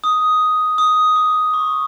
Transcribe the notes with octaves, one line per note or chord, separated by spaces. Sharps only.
D#6
D#6
D6
C#6